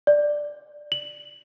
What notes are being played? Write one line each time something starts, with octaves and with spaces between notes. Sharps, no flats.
D5
F#7